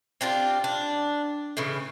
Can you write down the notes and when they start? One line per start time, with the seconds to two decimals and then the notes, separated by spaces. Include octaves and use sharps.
0.21 C4 D4 F4 G4
0.64 D4
1.57 A2 C#3 E3